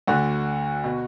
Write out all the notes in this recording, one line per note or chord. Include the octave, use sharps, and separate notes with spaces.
D2 D3 F#4
B2